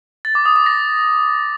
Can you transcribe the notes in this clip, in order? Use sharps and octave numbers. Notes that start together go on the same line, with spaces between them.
A6
D6
D#6
D6
A#6